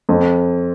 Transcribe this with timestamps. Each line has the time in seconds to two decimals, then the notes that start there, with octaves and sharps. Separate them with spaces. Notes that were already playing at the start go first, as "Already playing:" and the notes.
0.09 F2